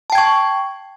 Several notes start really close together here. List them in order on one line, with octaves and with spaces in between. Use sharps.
A5 G5 G#6 C#6